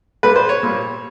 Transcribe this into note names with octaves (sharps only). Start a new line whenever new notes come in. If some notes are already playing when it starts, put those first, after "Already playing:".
A#2 G3 B4
C5
C#5
A#2 G3